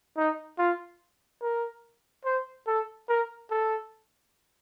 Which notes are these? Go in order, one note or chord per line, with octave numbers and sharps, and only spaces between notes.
D#4
F4
A#4
C5
A4
A#4
A4